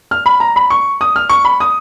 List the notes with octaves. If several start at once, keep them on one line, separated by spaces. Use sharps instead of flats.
F6
B5
A#5
B5
C#6
D#6
F6
C#6
B5
D#6